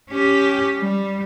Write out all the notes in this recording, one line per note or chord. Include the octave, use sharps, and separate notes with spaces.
C#4 G4
G3